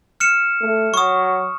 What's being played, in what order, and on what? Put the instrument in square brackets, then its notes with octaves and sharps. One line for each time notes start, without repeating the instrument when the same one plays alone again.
[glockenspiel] F6 C#7 E7
[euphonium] A3
[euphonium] F#3 [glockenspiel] C#6 D#6